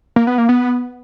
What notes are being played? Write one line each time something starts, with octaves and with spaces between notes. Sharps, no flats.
A#3
B3
A#3
B3